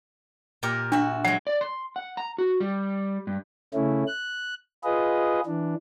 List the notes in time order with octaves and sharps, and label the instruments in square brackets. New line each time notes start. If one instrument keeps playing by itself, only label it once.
[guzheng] A#2 G4 A#4
[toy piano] D4 [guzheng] F#4 E5
[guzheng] F#3 G#3 [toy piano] F#5
[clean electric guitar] D5
C6
F#5
A#5
F#4
G3
G2
[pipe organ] C#3 A3 C#4 E4
F#6
F4 G#4 B4 D#5
E3 D4